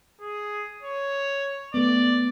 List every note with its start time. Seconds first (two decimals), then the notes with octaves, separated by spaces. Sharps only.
0.21 G#4
0.82 C#5
1.74 A3 B3 D5